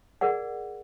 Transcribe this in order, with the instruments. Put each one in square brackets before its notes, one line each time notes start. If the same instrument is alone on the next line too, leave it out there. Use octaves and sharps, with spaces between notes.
[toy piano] G#4 A#4 D5 F#5